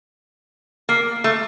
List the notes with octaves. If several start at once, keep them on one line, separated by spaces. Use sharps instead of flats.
A#3
A3